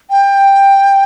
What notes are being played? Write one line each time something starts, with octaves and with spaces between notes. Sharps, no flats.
G5